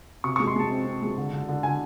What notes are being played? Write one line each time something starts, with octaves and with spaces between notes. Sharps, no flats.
C3 C#6
C#6
G#3
C6
G#3 A5
C4
C4
G#3
D3
D3
D3
D3 G#5